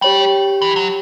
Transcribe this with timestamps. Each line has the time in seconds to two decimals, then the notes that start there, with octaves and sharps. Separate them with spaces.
0.01 G3 G4 C#5 G5
0.62 E3
0.76 F#3